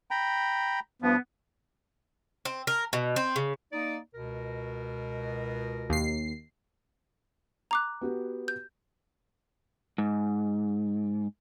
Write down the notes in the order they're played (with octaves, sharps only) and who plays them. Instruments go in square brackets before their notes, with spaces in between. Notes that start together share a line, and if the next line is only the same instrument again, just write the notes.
[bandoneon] G5 A#5 B5
[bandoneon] G2 F3 [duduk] B3
[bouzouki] C4
A#4
B2
C4
C#3
[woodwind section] A#3 D#4 D5
C#2 B2 A#4
[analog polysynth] D#2 C7
[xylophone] A#5 D6 F#6
[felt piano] B3 F#4 G4
[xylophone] G6
[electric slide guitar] G#2